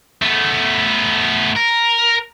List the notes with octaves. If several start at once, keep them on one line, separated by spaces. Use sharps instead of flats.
A3 B3
A#4